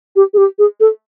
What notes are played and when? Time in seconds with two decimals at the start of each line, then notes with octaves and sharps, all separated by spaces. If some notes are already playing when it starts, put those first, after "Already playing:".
0.16 G4
0.34 G#4
0.37 G4
0.59 G#4
0.80 A4